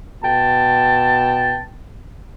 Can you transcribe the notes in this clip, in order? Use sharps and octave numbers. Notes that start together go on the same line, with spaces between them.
B2 G5 A5